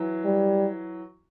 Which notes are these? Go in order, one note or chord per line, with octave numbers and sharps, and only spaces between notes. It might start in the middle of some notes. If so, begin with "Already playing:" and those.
Already playing: E3 F#3
G3